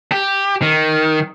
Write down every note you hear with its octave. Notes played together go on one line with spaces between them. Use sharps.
G4
D#3